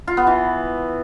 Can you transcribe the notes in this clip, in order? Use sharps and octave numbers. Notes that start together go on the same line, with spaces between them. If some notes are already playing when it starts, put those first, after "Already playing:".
F4
B3
E3